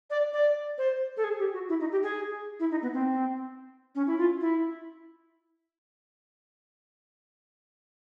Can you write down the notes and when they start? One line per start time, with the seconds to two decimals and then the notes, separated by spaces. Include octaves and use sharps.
0.10 D5
0.33 D5
0.78 C5
1.17 A4
1.24 G#4
1.39 G4
1.54 F#4
1.69 E4
1.80 D#4
1.92 G4
2.03 G#4
2.60 E4
2.71 D#4
2.82 B3
2.94 C4
3.95 C#4
4.07 E4
4.18 F4
4.41 E4